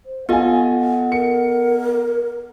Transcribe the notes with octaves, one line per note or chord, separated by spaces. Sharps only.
C5
B3 F4 A4 D#5 F#5 G#5
A#4 C#7